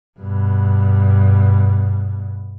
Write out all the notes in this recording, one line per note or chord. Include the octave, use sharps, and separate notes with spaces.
G2 B2